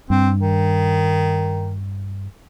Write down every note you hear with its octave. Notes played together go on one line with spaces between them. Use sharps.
G2 C4
D#3